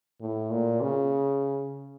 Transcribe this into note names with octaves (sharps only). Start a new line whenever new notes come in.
A2
A#2
C#3